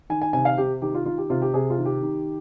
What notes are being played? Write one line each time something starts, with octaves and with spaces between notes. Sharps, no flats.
D#3 G#5
G#5
C3 G#5
F5
C3 G4
D#3 G4
F4
D#3 F4
G4
C3 F4
G4
C3 G#4
F4
D#3
G4
D#3